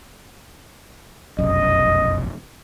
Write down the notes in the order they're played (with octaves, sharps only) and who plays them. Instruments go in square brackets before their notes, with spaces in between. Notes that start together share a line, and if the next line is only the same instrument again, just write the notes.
[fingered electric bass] F1 B1 F#2 [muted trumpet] D#5